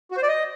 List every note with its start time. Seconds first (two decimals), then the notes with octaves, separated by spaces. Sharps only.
0.11 F#4
0.17 C5
0.23 D5
0.29 D#5